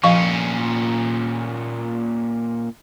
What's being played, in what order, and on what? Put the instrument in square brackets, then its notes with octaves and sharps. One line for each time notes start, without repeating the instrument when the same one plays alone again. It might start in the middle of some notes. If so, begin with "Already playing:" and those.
[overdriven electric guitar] A#2 C#4 [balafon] F3 F5 C#6